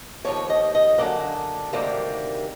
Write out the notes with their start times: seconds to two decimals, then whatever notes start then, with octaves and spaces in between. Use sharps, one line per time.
0.25 D#2 C#3 F3 C#5
0.50 D#5
0.75 D#5
0.98 F#2 D3 F#3 A#3 D5
1.73 D2 C3 D#3 G3 A#3